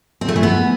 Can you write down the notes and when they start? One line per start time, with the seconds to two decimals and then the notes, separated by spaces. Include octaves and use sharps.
0.21 C4
0.28 A3
0.36 E3
0.43 B3